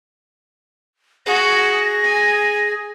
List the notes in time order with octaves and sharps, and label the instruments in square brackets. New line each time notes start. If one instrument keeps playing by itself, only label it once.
[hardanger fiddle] F#4 [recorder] G#4 [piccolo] A#6
[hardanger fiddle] G#5